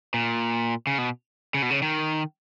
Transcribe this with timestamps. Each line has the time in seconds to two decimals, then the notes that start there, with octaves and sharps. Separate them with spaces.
0.14 A#2
0.87 C#3
0.98 B2
1.54 C#3
1.62 B2
1.71 C#3
1.82 D#3